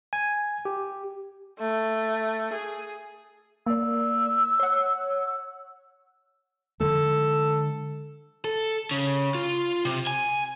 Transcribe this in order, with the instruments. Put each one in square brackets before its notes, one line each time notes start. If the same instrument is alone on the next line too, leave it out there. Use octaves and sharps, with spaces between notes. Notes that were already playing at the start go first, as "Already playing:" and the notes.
[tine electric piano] G#5
G4
[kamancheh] A3
G#4
[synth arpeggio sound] A#3 D5 [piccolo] E6
[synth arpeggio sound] C#5 F#5
[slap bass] D3 F3 G#3 [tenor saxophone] A4
[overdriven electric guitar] A4
C#3
F4
C3
G#5